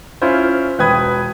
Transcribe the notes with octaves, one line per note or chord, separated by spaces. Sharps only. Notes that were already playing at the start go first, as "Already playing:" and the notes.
C#4 E4 F4 C5
E1 B4 G5 B5 D#6 G#6